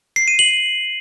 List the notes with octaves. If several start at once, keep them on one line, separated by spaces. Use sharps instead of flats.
C7
D#7
F#7